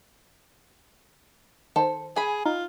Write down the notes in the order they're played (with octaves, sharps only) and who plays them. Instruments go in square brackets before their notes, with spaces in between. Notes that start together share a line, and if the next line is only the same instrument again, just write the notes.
[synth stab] D#3 C5 [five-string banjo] A4
[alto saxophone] G#4 [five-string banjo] G#5 B5
[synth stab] D#4 [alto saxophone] F4